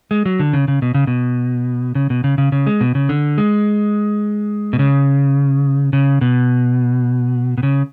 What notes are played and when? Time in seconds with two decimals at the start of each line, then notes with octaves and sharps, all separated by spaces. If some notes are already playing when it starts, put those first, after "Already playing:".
0.11 G#3
0.26 F#3
0.39 D3
0.53 C#3
0.68 C#3
0.82 B2
0.94 C#3
1.07 B2
1.95 C#3
2.10 B2
2.24 C#3
2.38 C#3
2.52 C#3
2.67 G#3
2.81 B2
2.95 C#3
3.09 D3
3.38 G#3
4.73 B2
4.79 C#3
5.93 C#3
6.21 B2
7.58 B2
7.63 C#3